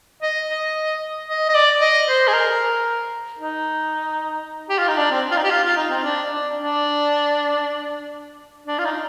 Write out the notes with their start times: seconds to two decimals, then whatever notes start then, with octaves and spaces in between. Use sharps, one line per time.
0.22 D#5
0.49 D#5
1.29 D#5
1.49 D#5
1.54 D5
1.81 D#5
2.07 C5
2.28 G#4
2.33 A#4
3.39 D#4
4.70 G4
4.79 F4
4.88 D#4
4.98 D4
5.11 C4
5.32 F4
5.37 D#4
5.44 G4
5.51 F4
5.64 F4
5.77 D#4
5.90 C4
6.03 D4
6.30 D4
6.56 D4
8.67 D4
8.79 F4
8.85 D#4